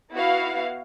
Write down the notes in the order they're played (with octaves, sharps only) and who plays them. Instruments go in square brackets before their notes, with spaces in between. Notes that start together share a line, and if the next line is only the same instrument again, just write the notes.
[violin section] B3 E4 F#4 F5